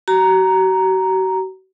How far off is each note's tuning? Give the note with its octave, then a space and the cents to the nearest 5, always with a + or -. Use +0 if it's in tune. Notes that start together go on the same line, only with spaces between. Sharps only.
F#4 +40 A#5 +0